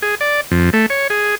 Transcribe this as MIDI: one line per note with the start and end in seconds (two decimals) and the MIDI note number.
0.02 0.15 68
0.21 0.41 74
0.51 0.70 41
0.73 0.86 57
0.90 1.08 73
1.10 1.35 68